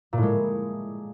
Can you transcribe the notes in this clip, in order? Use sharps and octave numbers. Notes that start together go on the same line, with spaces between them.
A#2
A2
G#3